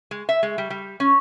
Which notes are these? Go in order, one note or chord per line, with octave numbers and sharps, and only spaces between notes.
G#3
E5
G#3
G3
G3
C#4